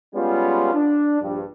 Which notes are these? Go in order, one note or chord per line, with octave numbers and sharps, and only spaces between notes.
G3 G#3 B3 C#4 F4
D4
A#1 G2